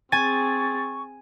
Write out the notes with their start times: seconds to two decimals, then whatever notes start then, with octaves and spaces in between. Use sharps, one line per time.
0.12 C4 G#4 G#5 C#6 A6